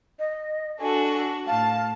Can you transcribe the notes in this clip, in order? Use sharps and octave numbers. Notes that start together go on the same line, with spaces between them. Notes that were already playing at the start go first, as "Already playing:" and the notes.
D#5
D4 F#4 A4 G#5
A2 F5 A5